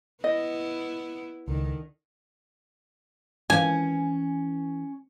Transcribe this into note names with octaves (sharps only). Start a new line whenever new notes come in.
B3 E4 D#5
C#2 D3 D#3
E3 C#4 G#5